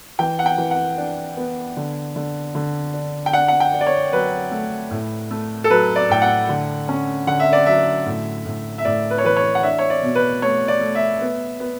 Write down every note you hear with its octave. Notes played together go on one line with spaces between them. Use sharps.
E3 G5
F#5
G5
E3
F#5
D4
B3
D3
D3
D3
D4
G5
D4 F#5
F#5
G5
D4
D5
C#5
F#3 B4
A3
A2
A3
A4
F#3 B4
D5
A2 G5
F#5
D3
C#4
D3 F#5
E5
D5
F#3 E5
A2
A2
E5
A2 D5
B4
C#5
E3 B4
C#5
F#5
D4 E5
C#5
D5
B2
B4
A3 C#5
D5
A3
E5
B3
B3